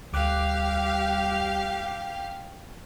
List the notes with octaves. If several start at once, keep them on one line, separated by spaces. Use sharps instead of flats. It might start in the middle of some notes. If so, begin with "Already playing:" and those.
D2 G3 G4 F5 D6 F#6